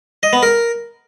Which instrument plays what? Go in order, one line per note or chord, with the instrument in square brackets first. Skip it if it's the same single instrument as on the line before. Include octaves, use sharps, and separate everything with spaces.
[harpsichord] D#5
B3
A#4